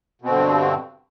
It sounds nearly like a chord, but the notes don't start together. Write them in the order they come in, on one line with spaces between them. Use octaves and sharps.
B2 C4 D3 G2